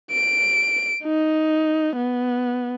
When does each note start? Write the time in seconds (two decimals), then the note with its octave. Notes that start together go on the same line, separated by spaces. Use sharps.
0.11 D7
1.04 D#4
1.96 B3